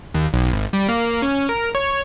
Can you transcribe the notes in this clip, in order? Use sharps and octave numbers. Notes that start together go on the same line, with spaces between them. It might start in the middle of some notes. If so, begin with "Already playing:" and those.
D#2
B1
G#1
G3
A#3
C#4
A#4
C#5